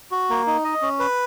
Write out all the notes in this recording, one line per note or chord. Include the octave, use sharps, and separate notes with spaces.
F#4
A#3
D#4
D#5
C#4
B4